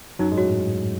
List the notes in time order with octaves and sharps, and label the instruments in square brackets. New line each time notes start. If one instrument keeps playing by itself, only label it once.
[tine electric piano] F#2 F#3 [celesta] D#4
[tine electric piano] G#2 G#3
[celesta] F#4 C#5
[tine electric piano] A2